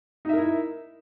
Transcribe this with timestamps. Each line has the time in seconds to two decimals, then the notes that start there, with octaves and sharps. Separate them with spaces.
0.25 D#4
0.29 E5
0.33 A#4
0.37 E4